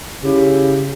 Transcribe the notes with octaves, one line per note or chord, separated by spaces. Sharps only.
C#3 E4 G4